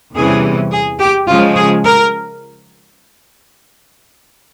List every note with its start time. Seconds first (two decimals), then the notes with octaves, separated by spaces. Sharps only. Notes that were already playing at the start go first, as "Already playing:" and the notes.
0.14 E2 C3 E3 G3 C#4 G#4
0.72 G#4
0.99 G4
1.28 C#3 F3 G#3 F4
1.56 G#4
1.85 A#4